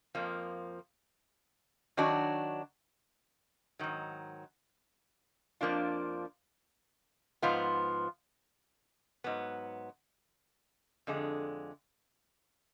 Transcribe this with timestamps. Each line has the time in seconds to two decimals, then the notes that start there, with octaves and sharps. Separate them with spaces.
0.15 F2 F3 A#3
1.97 D#3 F#3 D4 F#4
3.79 G#2 D#3 F#3
5.61 F2 F3 A#3 D4 F4
7.42 G#2 F3 B3 F4
9.24 G#2 F#3 B3
11.07 F2 D3 G#3